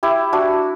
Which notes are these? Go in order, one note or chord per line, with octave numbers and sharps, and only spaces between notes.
E4 G4
D4 F#4